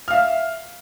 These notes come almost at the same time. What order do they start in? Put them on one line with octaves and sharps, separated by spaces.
F6 F5 E5